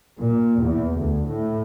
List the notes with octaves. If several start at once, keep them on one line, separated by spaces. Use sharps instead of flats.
A#2
E2
D2
A2